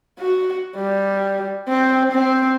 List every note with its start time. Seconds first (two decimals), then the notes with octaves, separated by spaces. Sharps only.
0.19 F#4
0.76 G3
1.68 C4
2.12 C4